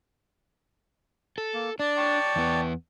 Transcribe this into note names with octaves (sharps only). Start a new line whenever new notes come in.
A4
A#3
D4 D5
G5 A5 C#6
E2 B3